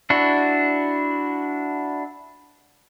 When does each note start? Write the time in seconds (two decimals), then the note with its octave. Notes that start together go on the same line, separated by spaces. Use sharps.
0.10 D4 E4 F#4